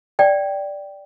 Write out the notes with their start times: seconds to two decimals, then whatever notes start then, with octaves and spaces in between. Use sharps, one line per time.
0.19 D5 G5